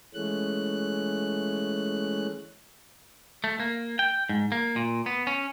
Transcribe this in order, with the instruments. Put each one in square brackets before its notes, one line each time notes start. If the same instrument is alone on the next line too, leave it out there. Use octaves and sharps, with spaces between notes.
[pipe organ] E3 G#3 A3 C#4 F#6
[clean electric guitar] A3
A#3
G5
G#2
A#3
A#2
B3
C#4